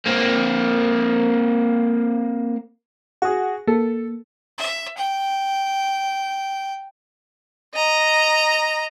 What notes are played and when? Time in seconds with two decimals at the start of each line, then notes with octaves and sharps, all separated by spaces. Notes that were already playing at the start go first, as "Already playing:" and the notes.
0.07 A#3 C4
3.22 F#4 G#4 F#5
3.67 A#3 A4
4.58 E5
4.97 G5
7.75 D#5 A#5